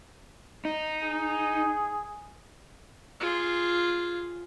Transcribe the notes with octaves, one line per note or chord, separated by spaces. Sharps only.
D#4
G#4
F4 G#4